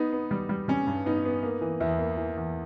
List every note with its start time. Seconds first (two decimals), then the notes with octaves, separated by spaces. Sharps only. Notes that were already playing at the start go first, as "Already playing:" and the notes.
Already playing: B3 D#4
0.13 B3
0.31 G3
0.49 G3
0.68 G3 C#4
0.87 G2
1.06 B3 D#4
1.25 B3
1.43 A#3
1.61 E3
1.80 E2 E4
1.99 A#3
2.17 E3
2.37 E2